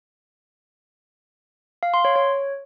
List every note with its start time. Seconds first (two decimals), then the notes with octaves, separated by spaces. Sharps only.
1.83 F5
1.94 C6
2.05 C#5
2.16 C#5